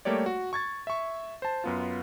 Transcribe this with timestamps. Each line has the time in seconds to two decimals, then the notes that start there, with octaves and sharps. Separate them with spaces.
0.05 G3 A3 A#3 G4 C#5 D5
0.26 F#4
0.53 C#6 G#6 A6
0.87 E5 C#6
1.42 C5 A5
1.64 F#2 B3 F4